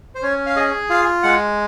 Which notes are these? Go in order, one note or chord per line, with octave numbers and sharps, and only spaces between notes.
C5
C#4 C#5
F5
G#4 D#5
F4 F5
G#3 F#5